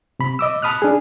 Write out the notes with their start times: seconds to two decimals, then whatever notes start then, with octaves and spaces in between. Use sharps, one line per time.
0.19 C3 B5
0.39 D#5 D6 E6
0.62 A5 B5 D#6 F6 F#6
0.82 D4 G#4